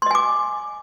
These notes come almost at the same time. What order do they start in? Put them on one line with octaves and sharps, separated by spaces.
C6 D#5 G#5 D6